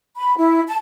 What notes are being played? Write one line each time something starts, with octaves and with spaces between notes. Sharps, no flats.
B5
E4
A5